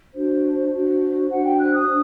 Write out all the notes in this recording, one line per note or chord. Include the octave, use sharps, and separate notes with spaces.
D4 F#4 C5
D4 F#4 C5
D4 F#4 C5 F#5
G5
F#6
D#6
D4